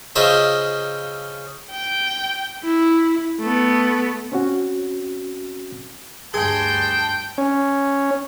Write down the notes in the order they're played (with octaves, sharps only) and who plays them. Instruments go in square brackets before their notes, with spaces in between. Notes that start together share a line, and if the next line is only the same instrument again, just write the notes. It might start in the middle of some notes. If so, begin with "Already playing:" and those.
[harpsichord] C#3 F4 C5 D#5 E5
[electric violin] G5
E4
A3 B3
[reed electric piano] C4 C#4 F#4
[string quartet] D2 G2 C6 [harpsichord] G#4 [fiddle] G5 [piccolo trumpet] A5
[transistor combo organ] C#4